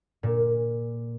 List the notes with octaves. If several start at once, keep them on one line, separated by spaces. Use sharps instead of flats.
A#2